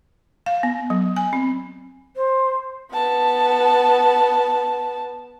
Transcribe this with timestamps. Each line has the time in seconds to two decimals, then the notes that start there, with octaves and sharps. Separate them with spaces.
0.46 F5
0.63 B3
0.90 F#3
1.16 G#5
1.33 C4
2.16 C5
2.93 B3 A5